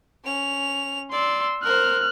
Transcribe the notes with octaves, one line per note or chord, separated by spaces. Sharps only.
C#4 F7
D5 C6 E6
A#4 C5 F6 F#6